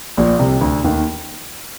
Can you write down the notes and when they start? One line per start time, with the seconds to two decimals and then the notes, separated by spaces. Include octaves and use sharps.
0.17 A#1 A#2
0.39 C2 C3
0.61 D2 D3
0.84 D#2 D#3